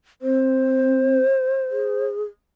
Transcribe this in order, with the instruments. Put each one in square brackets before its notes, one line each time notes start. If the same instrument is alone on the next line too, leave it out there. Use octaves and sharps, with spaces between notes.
[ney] C4 [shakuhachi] C5
[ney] G#4